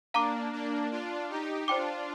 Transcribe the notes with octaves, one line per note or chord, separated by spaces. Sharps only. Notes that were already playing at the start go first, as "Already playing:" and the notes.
A#3 D4 F5 A#5 D6
A#3 D4
D4 F4
D#4 G4
D4 F4 C5 G5 D6